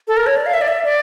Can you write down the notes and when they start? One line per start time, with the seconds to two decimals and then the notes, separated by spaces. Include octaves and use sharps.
0.08 A4
0.17 A#4
0.26 C#5
0.36 D5
0.46 F5
0.54 E5
0.61 D5
0.68 E5
0.85 D5